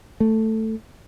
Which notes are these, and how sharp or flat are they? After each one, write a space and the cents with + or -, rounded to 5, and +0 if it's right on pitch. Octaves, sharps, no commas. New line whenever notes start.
A3 +5